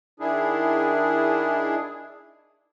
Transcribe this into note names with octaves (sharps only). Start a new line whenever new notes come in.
D#3 D4 E4 G#4